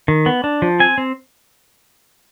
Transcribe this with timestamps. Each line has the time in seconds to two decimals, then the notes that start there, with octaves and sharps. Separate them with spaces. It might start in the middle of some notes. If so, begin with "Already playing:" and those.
0.08 D#3
0.26 B3
0.44 D4
0.62 F3
0.80 C4 G#5
0.98 C4